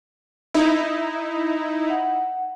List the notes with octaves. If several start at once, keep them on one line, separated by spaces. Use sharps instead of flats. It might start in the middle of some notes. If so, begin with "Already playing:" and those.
D#4 E4
F#5